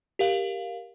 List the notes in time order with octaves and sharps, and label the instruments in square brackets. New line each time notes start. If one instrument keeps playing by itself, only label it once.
[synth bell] G4 A#4 F5 F#7